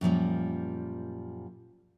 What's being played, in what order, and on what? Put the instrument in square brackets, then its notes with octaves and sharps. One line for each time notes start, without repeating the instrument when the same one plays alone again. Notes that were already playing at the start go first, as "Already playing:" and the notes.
[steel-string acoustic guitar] F#2 A#2 F3 G3